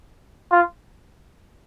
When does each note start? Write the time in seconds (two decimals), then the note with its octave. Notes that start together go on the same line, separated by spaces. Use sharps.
0.52 F4